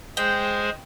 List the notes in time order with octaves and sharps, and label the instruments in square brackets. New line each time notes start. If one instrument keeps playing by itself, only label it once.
[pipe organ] G#3 G#4 C5 [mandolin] G5